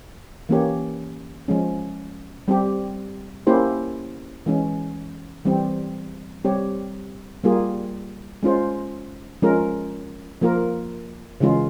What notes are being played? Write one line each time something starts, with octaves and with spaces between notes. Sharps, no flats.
E3 A#3 C#4 G4 C#5
F3 G#3 C#4
G3 C4 G4
A#3 C#4 E4 G4 C5
E3 G#3 C#4
E3 G3 C4
G3 C4 G4 C#5
G3 A#3 F4 G#4
G#3 C#4 F4 C5
F3 G#3 C#4 F4 A#4
F3 A#3 F4 A#4
C#3 E3 G#3 C#4 F4